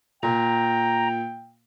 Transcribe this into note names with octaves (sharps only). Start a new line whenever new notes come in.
A#2 G5 A#5